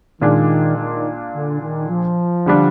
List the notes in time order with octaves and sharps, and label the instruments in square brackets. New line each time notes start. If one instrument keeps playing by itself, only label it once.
[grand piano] A#2 G#3 D4 F4 [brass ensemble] D#3
[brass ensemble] D#3
D3
D#3
F3
[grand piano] D3 G3 D4 F4